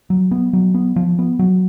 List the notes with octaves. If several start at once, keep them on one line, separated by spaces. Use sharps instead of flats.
F#3
B3
F#3
B3
F3
B3
F#3